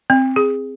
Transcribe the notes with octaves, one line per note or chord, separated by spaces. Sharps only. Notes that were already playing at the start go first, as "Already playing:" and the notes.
C4
G#4